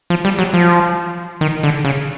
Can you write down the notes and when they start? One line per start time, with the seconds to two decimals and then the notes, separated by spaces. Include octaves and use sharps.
0.10 F3
0.25 G3
0.39 F#3
0.53 F3
1.41 D#3
1.63 D3
1.85 C#3